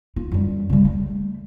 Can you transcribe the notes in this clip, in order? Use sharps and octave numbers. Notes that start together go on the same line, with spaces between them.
F4
F#2 G3
C#3 G3
A3